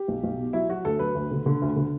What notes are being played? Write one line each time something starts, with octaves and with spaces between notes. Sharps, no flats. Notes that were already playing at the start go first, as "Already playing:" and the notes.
Already playing: G4
B1
B1
B2
F#3 E4
F#3 F#4
D2 A4
F#3 B4
D2
D3
D3
D2
D3